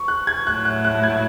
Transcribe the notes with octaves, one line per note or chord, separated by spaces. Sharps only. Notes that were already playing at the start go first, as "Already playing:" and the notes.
Already playing: C#6
F#6
G#6
A2 F#3 A3 E4 F#6
F#6
F#6
G#6